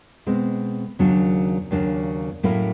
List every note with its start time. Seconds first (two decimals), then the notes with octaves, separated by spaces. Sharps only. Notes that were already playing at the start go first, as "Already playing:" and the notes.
0.26 B2 G#3 C4
0.99 D#2 C#3 F#3 A#3 D4
1.71 D#2 C#3 F#3 A#3 D4
2.43 A2 F#3 A#3 C#4 E4